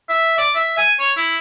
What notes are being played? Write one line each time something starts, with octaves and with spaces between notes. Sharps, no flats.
E5
D5
E5
G#5
C#5
E4